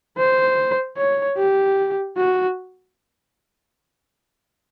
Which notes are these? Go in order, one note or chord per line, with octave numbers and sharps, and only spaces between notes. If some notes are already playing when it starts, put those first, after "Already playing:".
C5
C#5
G4
F#4